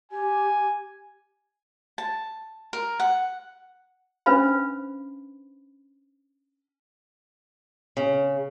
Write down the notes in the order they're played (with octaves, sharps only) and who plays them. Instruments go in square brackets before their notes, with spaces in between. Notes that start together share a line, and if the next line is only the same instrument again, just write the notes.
[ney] G4 [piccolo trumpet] G#5
[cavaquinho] A5
A#4
F#5
[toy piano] C#4 D4 B4 C5 F5 B5
[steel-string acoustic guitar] C#3